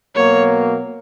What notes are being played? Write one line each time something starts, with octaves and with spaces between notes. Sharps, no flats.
B2 F#3 A#3 C#5